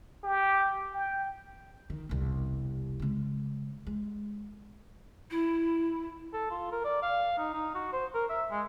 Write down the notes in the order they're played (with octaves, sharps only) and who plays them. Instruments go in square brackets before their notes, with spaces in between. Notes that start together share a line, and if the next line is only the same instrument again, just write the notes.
[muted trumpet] G4
G5
[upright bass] D#3
E1 C2
C#3 G#3
G#3
[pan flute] E4
[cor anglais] A4
F4
A#4
D5
F5
D#4
D#4
F#4
C5
A#4
E5
G#3